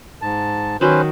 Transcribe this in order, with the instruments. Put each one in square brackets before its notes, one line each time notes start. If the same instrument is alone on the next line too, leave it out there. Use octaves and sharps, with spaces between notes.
[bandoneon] G#2 A5
[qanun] D#3 F#3 F#4 [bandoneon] C#4 B4 C5